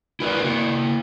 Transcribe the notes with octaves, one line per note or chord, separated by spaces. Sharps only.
E4 A#4 B4 D5
A#3 E4